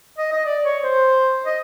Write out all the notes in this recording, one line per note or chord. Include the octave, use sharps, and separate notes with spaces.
D#5
D#5
D5
C#5
C5
D#5